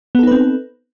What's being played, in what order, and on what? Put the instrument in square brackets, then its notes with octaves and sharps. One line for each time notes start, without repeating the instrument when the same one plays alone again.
[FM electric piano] B3
A4
D#4
B4
C4